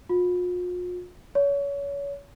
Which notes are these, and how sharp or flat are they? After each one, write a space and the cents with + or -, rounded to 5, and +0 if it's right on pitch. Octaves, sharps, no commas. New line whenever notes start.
F4 +45
C#5 +30